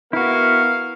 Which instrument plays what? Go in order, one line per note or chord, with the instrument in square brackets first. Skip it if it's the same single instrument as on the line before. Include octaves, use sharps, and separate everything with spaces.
[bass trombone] B3 [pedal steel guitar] E4 F#4 [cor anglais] A#4 [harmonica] F5